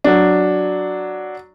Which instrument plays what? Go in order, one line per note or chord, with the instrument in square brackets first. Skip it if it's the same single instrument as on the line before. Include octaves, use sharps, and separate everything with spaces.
[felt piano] F#3 D4